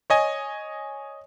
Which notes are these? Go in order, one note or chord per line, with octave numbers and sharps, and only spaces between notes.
C#5 D#5 G#5